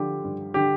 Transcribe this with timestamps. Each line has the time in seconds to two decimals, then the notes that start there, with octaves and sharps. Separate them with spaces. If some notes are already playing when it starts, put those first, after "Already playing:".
Already playing: D3 F3 G4
0.24 G2
0.54 D3 G4